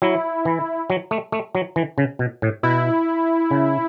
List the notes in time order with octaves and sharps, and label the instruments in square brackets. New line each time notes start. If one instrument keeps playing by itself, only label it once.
[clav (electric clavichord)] F#3 [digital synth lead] E4
[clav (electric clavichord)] E3
F#3
A3
A3
F#3
E3
C#3
B2
A2
[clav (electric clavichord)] B2 [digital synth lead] E4
[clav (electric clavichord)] C#3